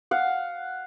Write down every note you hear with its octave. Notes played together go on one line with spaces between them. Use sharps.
F5 F#5